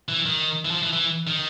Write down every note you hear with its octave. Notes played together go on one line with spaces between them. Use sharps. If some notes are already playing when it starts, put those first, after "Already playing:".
E3
D#3
E3
F3
E3
E3
D#3